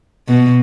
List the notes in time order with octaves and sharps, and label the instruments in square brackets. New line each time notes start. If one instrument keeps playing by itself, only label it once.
[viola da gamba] B2